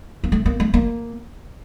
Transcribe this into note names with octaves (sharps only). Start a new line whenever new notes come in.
A#3
A3
A#3
A3
A#3